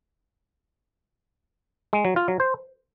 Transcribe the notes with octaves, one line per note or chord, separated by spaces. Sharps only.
G#3
F#3
F4
F#3
C5